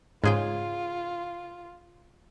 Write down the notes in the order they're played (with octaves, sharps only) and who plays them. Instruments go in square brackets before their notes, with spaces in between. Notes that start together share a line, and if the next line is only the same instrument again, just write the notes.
[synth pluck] G#2 [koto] C#3 G#4 G5 [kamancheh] F4